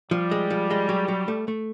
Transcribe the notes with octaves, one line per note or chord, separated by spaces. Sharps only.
F3 G3
G#3
F3
G#3
F#3
F#3
A3
A3